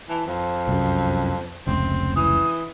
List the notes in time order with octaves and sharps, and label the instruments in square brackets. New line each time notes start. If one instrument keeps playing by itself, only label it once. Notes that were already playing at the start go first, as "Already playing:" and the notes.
[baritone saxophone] E3 [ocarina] A5
[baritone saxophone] F2 [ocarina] C5
[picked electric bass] C2 F#2
[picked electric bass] F1 C#2 [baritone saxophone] C4
[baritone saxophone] E3 [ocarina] D#6